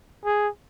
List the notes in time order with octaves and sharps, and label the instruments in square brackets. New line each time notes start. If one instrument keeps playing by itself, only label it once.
[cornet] G#4